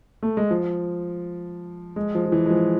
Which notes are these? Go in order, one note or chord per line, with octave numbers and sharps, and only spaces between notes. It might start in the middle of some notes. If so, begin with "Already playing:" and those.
A3
G#3
F3
G#3
F3
F3
E3
G#3
F3